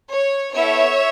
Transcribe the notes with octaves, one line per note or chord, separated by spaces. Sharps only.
C#5
B3 E4 A4 C#5 E5